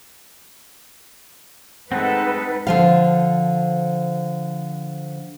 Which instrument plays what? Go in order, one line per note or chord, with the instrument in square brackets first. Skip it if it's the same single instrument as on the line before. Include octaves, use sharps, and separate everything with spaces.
[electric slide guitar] G#3 A3 C4 [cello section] D#4 B4 [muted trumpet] A4 [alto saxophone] F#5
[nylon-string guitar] D3 F3 F5